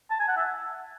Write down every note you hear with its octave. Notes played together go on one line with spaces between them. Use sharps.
A5
G#5
F#5
E5